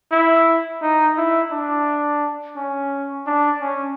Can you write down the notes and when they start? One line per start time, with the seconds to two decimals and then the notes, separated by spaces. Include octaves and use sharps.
0.12 E4
0.82 D#4
1.17 E4
1.51 D4
2.56 C#4
3.27 D4
3.61 C#4